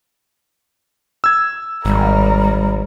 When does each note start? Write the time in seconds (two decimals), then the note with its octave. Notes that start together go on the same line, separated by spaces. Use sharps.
1.24 E6 G#6
1.85 G#1 G3 A#4